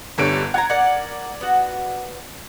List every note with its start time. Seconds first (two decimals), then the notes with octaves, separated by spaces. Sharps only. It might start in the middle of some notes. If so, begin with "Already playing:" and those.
0.18 G1 D3 C#4 G4 C#5 D7
0.54 F4 F#5 A#5 G#6
0.70 A#4 D5 F#5
1.41 B3 F#4